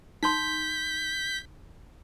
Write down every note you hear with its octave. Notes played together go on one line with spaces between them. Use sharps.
D#4 C6 G6 B6